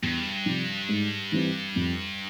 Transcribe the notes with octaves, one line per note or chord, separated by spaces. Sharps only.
E2 G2
C3 F3
G#2
E3 G3 C4
F2